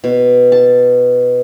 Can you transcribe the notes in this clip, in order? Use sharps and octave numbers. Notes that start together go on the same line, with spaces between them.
B2
A5